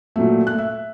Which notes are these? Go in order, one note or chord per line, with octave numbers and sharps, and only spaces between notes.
A#2 F#3 A3
A3 F#6
E5